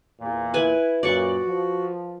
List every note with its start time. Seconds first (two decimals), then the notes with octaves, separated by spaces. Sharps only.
0.20 E2 A#2
0.54 E4 B4 G#5
1.03 F#2 A#2 F#4 D5 F#5 C#6
1.47 F3